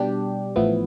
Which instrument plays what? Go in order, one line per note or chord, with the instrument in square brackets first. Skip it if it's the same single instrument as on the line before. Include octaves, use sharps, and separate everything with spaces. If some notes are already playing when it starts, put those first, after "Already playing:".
Already playing: [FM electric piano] B2 G3 D4 G4
A1 A2 F3 B3 E4